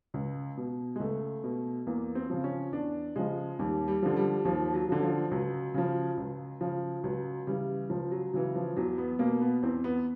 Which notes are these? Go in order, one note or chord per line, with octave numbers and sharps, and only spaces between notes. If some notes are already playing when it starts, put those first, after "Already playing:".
C#2
B2
G#3
C#2 A3
B2
E2 A#3
C4
C#3 F3
C#4
E2 D4
C#3 F3 G#3
D#2 G3
G3
D3 F3
G3
D#2 F3
F#3
D3 F3
F3
C#2 F#3
C#3 F3
C#2
C#3 F3
C#2 F#3
C#3 E3 G3
C#2 F3
F#3
C#3 E3 F#3
F3
E2 F#3
B3
B2 A#3
B3
E2 C4
B3